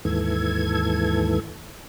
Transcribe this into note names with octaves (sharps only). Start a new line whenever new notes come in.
D#2 G#2 E3 A4 G#6